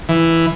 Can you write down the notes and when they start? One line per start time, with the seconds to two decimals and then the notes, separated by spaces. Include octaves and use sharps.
0.09 E3